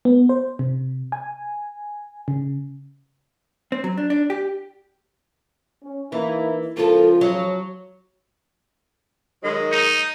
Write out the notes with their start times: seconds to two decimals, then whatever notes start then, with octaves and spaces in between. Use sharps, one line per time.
0.05 B3
0.29 C5
0.59 C3
1.12 G#5
2.28 C#3
3.72 C4
3.84 F#3
3.98 D4
4.10 D4
4.30 G4
5.83 C#4
6.12 E3 A#3 D#4 E4
6.77 C#2 F3 A#3 F4 A4
7.21 F#3
9.43 D#3 F#3 G#3
9.72 D#4